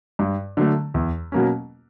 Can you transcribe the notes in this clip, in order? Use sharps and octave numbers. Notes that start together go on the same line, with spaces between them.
G2
D3 F#3 A3
E2
B2 F#3 A#3 C#4